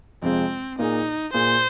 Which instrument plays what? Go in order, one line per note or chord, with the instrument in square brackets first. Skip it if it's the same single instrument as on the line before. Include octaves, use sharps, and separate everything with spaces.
[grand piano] F2 C3 G#3 F4 [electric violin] C4
[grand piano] A#2 A#3 G#4 [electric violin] D#4
[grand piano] A#2 A#3 G#4 [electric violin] C5